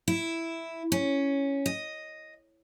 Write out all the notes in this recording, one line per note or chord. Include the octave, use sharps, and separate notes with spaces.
E4
C#4
D#5